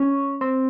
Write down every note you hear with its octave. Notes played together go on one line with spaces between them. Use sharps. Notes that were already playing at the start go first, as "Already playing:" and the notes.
Already playing: C#4
C4